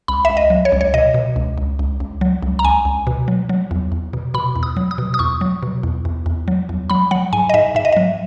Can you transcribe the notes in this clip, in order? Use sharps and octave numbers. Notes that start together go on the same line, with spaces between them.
C#2 B5
E5
C#2
D#5
F#3
C#5
C#2
C#5
B2 D#5
B2
C#2
C#2
C#2
C#2
F#3
C#2
A#5
C#2 G#5
C#2
B2
F#3
F#3
E2
E2
B2
B2 B5
E2
D#6
F#3
D#6
B2
D#6
E2 C#6
F#3
B2
E2
E2
E2
F#3
E2
F#3 B5
F#3 F#5
G#2 G#5
D#5
G#2 E5
G#2 E5
D#5
F#3 E5